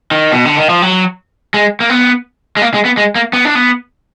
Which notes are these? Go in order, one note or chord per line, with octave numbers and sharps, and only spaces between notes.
D#3
B2
D3
D#3
F3
F#3
G#3
A#3
B3
G#3
A#3
G#3
B3
G#3
A#3
B3
D4
B3